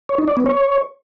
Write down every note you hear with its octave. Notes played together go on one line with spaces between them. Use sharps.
C#5
D#4
D5
B3
C#5